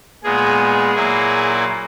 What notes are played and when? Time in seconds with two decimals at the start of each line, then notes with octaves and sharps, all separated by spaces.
0.23 A#2 G#3 B3 G#4
0.94 A#2 F#3 A#3 E4